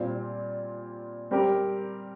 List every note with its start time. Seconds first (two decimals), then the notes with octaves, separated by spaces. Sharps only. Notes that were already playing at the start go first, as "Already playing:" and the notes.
Already playing: A#2 G3 C4 F4
1.31 G3 C4 G4 A#4